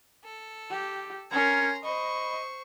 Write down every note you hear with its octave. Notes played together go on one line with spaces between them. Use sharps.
A4
G4
C#4 A#4 A#5 C6 G#6
C5 D#5 B5 C#6